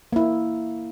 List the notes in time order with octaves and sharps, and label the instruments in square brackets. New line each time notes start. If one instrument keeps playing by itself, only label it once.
[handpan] A#3 E4